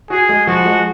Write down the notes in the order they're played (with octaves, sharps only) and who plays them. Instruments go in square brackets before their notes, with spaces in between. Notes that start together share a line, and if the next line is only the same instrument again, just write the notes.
[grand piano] F#4 [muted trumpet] G#4
[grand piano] G#3
[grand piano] F3 [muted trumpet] F#4
[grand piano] G#3